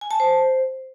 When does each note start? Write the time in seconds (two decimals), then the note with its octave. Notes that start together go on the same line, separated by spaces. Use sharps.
0.01 G#5
0.11 A5
0.20 C5